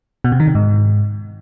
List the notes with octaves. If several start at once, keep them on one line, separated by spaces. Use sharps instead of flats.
B2
C3
D#3
C3
G#2